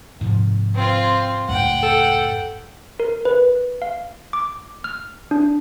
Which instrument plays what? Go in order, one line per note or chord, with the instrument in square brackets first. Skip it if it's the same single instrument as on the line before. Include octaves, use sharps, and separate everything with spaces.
[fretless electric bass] G#2 C3 F3
[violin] C4 F4
[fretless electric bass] C#2 F#2 A2 [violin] F#5 G5
[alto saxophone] A4
[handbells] A#4
B4
F5
D6
F6
D4